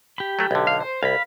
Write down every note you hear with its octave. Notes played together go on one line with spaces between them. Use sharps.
G4 B5
F#3 A3
B1 D3
F5
C5
C2 F5 B5